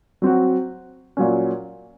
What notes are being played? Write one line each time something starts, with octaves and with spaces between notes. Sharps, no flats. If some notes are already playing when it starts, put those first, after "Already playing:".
F#3 C4 F#4
A#2 F#3 C#4